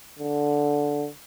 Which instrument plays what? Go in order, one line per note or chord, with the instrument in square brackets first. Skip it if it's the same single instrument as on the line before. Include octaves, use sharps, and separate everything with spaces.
[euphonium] D3